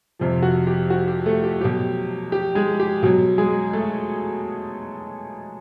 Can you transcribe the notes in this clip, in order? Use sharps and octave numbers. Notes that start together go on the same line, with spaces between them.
F2 C3 F3
F#4
G4
F#4
G4
A3 A4
G4
B2 F#3 G4
G4
G#3 G#4
G4
B2 F#3
G#3 G#4
A3 A4